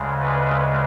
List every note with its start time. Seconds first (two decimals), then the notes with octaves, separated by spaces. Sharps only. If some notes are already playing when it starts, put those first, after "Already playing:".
Already playing: D2 C#3 G#3
0.22 B4